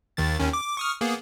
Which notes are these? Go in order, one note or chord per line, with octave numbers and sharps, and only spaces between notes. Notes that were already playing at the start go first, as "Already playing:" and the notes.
D#2 D#3 A6
D#2 D#3 C#4
D6
C#6 D#6 F6
A#3 B3 G#4